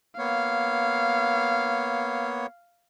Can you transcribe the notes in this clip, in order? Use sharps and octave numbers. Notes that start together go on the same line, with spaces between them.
A#3 B3 C#5 F5